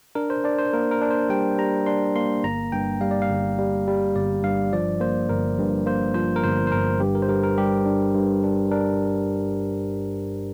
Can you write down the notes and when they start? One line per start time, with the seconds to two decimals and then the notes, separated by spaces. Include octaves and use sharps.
0.15 D4 A#4
0.30 C5
0.44 D4 D5
0.59 C5
0.73 A#3 A#4
0.91 A#4
1.01 D4
1.11 C5
1.30 G3 G5
1.58 G3 A#5
1.86 D4 C6
2.16 A#3 C6
2.44 G1 A#5
2.72 G2 G5
3.01 G3 F5
3.11 D5
3.22 F5
3.29 G1
3.59 G3
3.87 G3
4.15 G1 D5
4.44 G2 F5
4.73 F3 D5
5.00 A#3 C5
5.29 G1 A#4
5.58 G2
5.86 A#3 C5
6.14 F3 C5
6.36 A#4
6.43 G1 C5
6.67 C5
6.71 G1 A#4
7.00 G2 G4
7.15 A#4
7.22 C5
7.29 G2 A#4
7.43 A#4
7.58 G3 G4
7.86 D4
8.14 G2
8.43 D4
8.71 D4 A#4